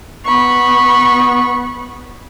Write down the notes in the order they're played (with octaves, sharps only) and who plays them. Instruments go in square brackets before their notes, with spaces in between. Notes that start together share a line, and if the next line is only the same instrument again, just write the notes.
[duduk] B3 [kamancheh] B5 C#6